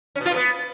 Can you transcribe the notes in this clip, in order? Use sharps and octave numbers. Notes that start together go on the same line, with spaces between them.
C#4
B2
F4
B2
B3